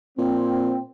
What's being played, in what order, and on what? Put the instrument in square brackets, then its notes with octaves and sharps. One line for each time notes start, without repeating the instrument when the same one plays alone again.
[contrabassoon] A#2 [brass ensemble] C4